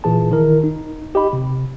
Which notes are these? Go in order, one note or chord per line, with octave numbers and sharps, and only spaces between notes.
A#2 E3 G#4 A5
D#3 E4 A#4
D#4
G4 D#5 B5
C3